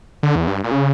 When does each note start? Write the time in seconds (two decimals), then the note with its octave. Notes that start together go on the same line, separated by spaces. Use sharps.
0.23 D3
0.35 E2
0.48 G2
0.64 A#2
0.71 C#3